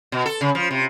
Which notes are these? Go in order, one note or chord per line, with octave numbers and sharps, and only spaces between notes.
B2
A4
C#3
F3
C3